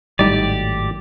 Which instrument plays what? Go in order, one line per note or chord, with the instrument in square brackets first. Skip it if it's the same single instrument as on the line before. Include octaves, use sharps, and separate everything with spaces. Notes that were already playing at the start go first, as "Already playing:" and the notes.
[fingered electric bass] G#1 A2 F#3 [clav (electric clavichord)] G3 D#4 [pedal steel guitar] G4 D5